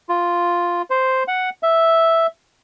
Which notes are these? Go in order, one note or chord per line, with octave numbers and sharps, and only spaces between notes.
F4
C5
F#5
E5